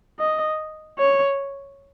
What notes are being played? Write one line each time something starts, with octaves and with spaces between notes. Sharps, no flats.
D#5
C#5